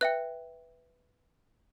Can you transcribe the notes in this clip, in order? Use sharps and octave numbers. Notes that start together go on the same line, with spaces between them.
B4 E5 G5 F#6